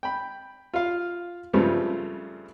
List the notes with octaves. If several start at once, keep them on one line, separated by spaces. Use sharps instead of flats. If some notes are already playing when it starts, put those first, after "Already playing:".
G5 B5
F4 F5
G2 C#3 F3 G3 A3 C4